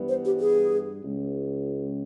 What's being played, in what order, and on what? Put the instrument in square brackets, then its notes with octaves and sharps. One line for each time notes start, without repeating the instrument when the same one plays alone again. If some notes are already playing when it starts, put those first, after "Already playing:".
Already playing: [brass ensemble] G2 E3 G3 B3
[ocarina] C5
G4
G#4
[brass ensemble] C#2